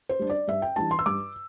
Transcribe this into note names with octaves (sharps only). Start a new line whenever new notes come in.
C5
G3 D4
D5
G2 E5
G5
E3 G3 D4 A5
C6
E6
G2 D6